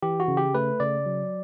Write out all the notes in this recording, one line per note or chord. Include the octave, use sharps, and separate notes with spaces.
E3 G4
F#4
C#3
G4
A3 B4
C#3 D5
F#3